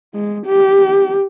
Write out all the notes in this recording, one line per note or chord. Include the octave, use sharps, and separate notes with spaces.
G#3
G4